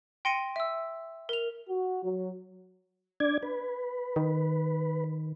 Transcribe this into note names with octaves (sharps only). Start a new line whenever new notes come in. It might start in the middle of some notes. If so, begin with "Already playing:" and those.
G5 C6 A#6 C#7 D#7
E5 E6
A#4 F7
F#4
F#3
D4 D5 G#6
B4
D#3